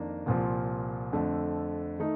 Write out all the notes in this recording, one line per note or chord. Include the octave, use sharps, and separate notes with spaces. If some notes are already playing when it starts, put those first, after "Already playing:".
Already playing: F2 D#3 A#3 D4
C2 A#2 F3
F2 D3 A3
D#3 A3 D#4